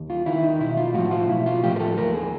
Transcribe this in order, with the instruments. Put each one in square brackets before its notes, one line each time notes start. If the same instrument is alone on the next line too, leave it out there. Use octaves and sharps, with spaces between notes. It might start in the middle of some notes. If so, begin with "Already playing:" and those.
Already playing: [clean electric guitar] D#2
F4
D#3 E4
D#4
B1 E4
F4
A2 F3 F#4
F4
B1 E4
F4
A2 F3 G4
A#4
A4
D#2 A#4
G#4